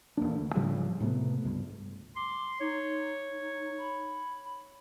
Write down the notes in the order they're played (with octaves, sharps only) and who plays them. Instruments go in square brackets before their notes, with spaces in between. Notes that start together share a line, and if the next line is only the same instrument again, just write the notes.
[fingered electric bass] D#1 E2 A#3 D4
D2
G#2 C#3 F3 G3
A2 C3 A3 B3
C#2 G2
[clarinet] C6 [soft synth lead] D6
[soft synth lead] D#4 [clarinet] C#5
[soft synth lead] B5